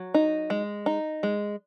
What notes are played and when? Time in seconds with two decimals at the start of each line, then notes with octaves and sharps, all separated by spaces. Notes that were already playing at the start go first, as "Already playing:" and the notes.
Already playing: F#3
0.14 D#4
0.50 G#3
0.86 D#4
1.23 G#3